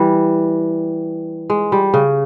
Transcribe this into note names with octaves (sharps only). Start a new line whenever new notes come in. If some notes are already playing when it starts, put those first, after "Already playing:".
Already playing: E3 G3
G#3
G3
C#3